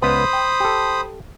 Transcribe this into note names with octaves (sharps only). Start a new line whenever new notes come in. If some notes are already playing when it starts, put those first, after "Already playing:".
C#2 B3 B4 C5 B5 D#6
G5
G4 A4